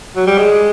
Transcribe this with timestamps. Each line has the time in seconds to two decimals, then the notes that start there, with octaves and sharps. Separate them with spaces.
0.16 F#3
0.27 G3
0.38 G#3